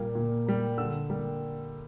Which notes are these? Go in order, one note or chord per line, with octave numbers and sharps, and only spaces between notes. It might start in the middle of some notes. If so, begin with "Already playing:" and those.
Already playing: A#2 G3 A#3
A#2
G3 A#3
D3 E6
G3 A#3